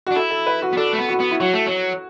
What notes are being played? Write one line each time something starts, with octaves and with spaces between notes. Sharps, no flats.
D4 F#4
E4 A4
A4
B4
F#4
B3
D4 A4
A3
B3
F#4
B3
E4
F#3 F#4
A3
F#3